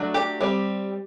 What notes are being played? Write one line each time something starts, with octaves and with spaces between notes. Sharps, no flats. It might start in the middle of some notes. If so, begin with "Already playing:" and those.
Already playing: F#3 A3 D4
G4
G3 C4